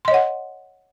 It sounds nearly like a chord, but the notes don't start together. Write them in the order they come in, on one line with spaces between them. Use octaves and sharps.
C6 D#5 C#5 F#5